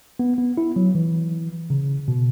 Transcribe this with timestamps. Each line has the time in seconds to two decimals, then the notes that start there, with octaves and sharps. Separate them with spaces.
0.19 B3
0.38 B3
0.58 E4
0.76 F#3
0.95 E3
1.70 C#3
2.08 B2